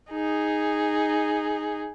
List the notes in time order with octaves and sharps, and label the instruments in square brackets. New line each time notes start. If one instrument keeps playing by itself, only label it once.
[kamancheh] D#4 G#4